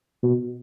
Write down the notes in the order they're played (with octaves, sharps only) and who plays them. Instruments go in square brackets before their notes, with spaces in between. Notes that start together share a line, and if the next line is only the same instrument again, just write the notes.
[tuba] B2